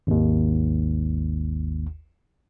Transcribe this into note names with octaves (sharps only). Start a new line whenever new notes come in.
G#1 D#2